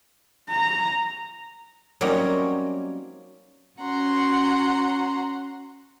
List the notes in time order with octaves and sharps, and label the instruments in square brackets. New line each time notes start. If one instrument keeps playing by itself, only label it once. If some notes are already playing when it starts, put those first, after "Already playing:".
[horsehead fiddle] A#5
[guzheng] F#3 G3 A#3 C4 C#4 D#4
[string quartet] C#4 F#4 F#5 A#5 C6